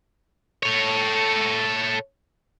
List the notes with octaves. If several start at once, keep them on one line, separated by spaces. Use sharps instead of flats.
A4 C#5